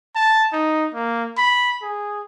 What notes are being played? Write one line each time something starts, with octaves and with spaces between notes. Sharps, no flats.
A5
D#4
A#3
B5
G#4